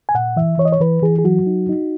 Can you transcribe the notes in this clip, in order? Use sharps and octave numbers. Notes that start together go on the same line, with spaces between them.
G#5
A#2 F#5
E3 E5
E3 C#5
D#5
C#5
E3 B4
E3 G#4
G#4
F#3 F#4
D#4
D#4